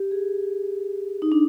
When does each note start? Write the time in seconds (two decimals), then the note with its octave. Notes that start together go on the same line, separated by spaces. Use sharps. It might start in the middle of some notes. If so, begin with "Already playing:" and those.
Already playing: G4
0.11 G#4
1.22 D#4
1.32 D4